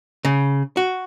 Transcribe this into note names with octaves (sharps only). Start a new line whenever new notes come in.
C#3
F#4